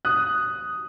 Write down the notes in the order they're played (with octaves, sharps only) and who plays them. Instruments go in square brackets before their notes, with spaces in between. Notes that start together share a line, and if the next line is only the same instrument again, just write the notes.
[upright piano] D#6 F#6